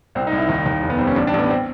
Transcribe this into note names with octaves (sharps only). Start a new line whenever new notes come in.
C2 C4
D#4
C2
E4
D#2 D#4
D#2
F1
B3
G3 C4
C#4
A1 D4
D4
A1 B3
C4